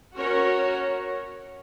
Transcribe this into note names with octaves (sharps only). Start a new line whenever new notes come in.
C#4 F#4 A#4 C#5